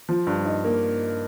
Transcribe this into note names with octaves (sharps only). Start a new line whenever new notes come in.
F3
G2
D#4
A#3